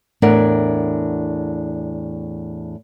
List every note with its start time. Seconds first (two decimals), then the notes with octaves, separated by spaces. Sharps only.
0.22 E2 A2 D4 A#4 E5 F#5